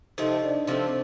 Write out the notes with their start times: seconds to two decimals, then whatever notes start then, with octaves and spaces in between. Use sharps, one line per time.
0.18 C3 F3 A3 D#4 D#5
0.43 D4 D5
0.67 C3 F3 A3 C4 C5